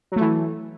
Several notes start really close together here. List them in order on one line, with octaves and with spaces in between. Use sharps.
F#3 A3 E3